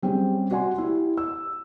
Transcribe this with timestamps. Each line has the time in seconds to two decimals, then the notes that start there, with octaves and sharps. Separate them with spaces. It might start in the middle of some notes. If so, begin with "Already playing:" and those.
0.02 G3 C4 C#4 G4 G#4
0.51 F#4 D5 F#5 G#5 C6
0.78 E4 G4
1.18 E6